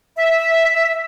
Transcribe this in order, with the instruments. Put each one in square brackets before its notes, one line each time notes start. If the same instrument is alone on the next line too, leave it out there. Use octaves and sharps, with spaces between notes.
[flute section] E5